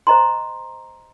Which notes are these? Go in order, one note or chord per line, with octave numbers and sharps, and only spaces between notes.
C5 D#5 A#5 C6